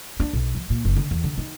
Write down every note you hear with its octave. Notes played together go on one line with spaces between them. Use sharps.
D4
B1
F3
A#2
F#1
D3
E2
D3
D#3